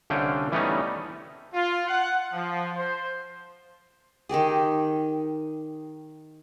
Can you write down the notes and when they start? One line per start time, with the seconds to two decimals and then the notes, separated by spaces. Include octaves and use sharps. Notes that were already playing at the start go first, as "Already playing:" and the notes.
0.10 C2 D3 C#4 F5 G5
0.52 E3 G3 A3 B3 C#4 D#4
1.54 F4
1.88 F#5
2.32 F3
2.77 C5
4.29 D#3 D#4 G4 G#4